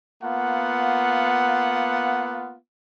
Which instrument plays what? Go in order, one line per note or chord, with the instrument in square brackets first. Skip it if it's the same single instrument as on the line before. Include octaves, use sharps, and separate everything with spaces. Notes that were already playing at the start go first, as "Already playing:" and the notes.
[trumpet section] A#3 B3 F4 F#5